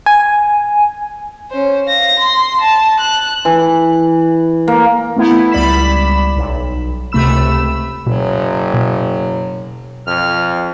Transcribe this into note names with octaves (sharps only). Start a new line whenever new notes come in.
G#5
C#4 C5
F5 A#6
C6
A5
F#6
E3
A#3
A3 B3 E4
C#2 G3 D5 B5 B6 E7
B1
C#2 C3 A3 B5 E6 E7
F#1 B2 F#3
B2
F2 F6